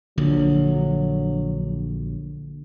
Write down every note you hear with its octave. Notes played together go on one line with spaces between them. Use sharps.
A#1 D3 F#3